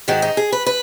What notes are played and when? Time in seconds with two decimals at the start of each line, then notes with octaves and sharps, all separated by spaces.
0.08 G#2 D#3 F#4
0.22 D#4
0.37 G#4
0.52 B4
0.66 B4